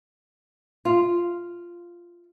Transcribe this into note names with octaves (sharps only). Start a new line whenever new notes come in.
F4